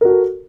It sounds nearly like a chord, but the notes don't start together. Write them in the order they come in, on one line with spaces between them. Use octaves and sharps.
A#4 F#4 A4